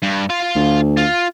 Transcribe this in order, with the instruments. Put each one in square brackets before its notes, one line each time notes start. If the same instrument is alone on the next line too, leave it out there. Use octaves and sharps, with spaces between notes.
[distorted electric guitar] G2
F4 F5
[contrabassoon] D2
[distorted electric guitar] F4